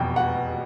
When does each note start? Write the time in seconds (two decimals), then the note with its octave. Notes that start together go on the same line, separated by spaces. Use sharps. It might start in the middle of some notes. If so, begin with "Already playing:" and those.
Already playing: F1 E2 B2 G5
0.16 F#5